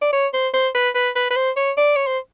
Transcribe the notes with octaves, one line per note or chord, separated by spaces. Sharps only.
D5
C#5
C5
C5
B4
B4
B4
B4
C5
C#5
D5
C#5
C5